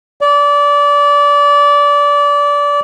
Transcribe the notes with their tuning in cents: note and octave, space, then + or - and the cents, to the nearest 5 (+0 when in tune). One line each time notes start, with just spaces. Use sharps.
D5 -25